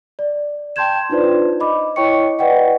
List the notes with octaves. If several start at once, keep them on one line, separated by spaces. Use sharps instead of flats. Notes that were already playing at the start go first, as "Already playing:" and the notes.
D5
G5 A5 C6 G6 G#6 E7
D4 D#4 F4 B4 C5 D5
D#5 B5 D6
E4 C#5 D#5 G5 C#6 C#7
B4 D5 D#5 F#5 G5